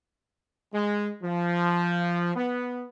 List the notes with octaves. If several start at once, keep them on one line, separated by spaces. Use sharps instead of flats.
G#3
F3
B3